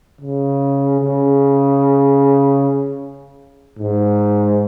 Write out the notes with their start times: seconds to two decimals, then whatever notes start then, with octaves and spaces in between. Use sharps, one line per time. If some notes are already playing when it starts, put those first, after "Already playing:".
0.21 C#3
1.01 C#3
3.79 G#2